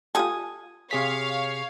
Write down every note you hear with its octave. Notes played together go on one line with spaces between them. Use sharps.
F4 G4 A4 G#5 D#6
C3 G#4 C#5 F5 B6